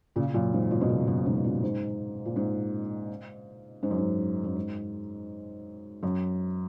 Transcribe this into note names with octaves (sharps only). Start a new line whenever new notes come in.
A#2 C#3
F#2 A#2
G#2
F#2 A#2
B2
A#2 C#3
F#2 A#2
G#2 B2
B2
F#2 A#2
G#2
A#2
G#2
G#2
F#2
G#2
F#2
G#2
F#2